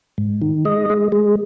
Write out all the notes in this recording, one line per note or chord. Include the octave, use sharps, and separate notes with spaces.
G#2
D#3
G#3 D#5
G#3
G#3